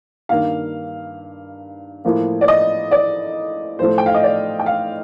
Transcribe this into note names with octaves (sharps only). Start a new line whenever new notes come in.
G2 D#3 A#3 F5
A2 F3 A#3
D5
D#5
D5
A2 F3 A3 C5
G5
F5
D#5
D5
G5
F5